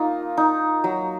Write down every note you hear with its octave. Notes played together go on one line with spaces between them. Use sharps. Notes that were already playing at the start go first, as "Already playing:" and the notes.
Already playing: A#3 D#4 F4
D#4
F#3